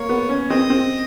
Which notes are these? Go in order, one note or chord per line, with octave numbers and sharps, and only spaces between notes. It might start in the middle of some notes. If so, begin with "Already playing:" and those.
Already playing: A#3 C#5
B3
C#4
C4 D#5
C4